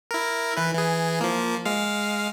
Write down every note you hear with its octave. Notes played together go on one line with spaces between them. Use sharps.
E4 A#4
E3 B4
E3 G#4
F3 A#3
G#3 F5